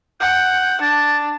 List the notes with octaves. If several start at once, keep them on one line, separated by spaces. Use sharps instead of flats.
F#5 G6
D4 A6